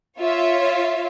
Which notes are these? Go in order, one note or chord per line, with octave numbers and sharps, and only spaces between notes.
F4 C#5 E5